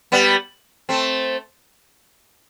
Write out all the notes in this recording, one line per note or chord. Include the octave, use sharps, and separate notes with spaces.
G3 B3
A3 C4